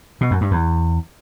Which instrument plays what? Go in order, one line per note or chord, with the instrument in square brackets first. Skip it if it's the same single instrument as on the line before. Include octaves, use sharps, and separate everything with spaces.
[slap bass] B2
F#2
G2
E2